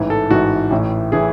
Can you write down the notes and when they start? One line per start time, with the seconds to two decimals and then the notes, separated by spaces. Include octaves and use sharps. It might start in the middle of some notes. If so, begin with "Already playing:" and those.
Already playing: A1 G#2 E3
0.10 A4
0.30 A1 G#2 E3 F#4
0.71 A1 A2 E3
1.12 A2 E3 G#4